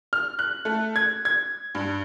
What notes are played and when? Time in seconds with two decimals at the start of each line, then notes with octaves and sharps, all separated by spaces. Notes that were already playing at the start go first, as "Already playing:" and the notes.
0.13 F6
0.39 F#6
0.65 A3
0.96 G#6
1.25 G#6
1.75 G2